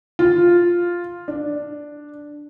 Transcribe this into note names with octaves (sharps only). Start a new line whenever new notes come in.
F4
D4